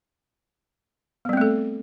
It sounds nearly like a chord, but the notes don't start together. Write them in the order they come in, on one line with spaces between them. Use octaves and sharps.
B3 G3 C4 A3 A4